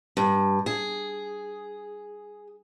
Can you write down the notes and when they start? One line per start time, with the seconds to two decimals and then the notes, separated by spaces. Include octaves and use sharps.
0.17 G2
0.66 G#4